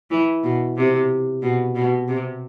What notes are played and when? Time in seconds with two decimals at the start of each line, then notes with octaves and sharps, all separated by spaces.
0.11 E3
0.44 B2
0.77 C3
1.42 B2
1.75 B2
2.08 C3